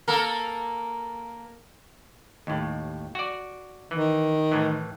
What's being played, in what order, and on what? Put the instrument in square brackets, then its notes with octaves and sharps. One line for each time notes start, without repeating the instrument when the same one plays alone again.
[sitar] A#3 A4 A#4
[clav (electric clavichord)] D#2 A2
F#4 D5
[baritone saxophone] D#3 [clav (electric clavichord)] E3
[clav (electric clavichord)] A2 E3